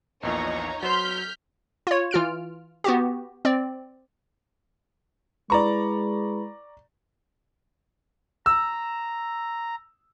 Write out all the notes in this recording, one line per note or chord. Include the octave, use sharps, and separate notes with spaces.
A#1 E2 A#2 D#4 C#5 A#5
F#3 B3 C5 C6 F6 G6 B6
F4 C#5
E3 F4 F6 D7
B3 F#4 G4
C4 D5
G#3 E4 B4 D5 A#5 B5 C#6
A#5 E6